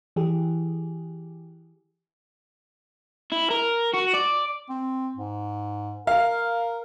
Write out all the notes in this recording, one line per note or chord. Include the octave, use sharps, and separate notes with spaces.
E3 G4 G#4
E4
A#4
F#4
D5
C4
G#2
A#4 F5